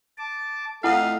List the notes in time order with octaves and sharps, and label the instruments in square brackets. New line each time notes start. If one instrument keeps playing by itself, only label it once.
[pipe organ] A5 D6
[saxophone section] F2 D#5 F5 [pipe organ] A3 [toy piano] E4 F#5